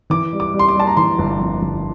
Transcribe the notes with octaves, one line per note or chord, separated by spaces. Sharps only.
E3 D6
G3
D6
G3
C6
D6
G3 A5
A#5
E3 C6
G1
F2
G1